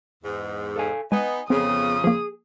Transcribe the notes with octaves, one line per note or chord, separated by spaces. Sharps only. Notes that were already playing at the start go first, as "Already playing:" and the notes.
E2 G#2
A4 F5 G#5
G#3 B3 D#4 G#5
F2 C#3 B3 C4 G#4 D#6
F3 A#3 G#4